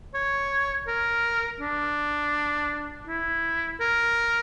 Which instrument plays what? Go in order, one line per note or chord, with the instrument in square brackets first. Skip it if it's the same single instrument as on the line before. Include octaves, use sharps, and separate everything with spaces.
[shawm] C#5
A#4
D4
E4
A#4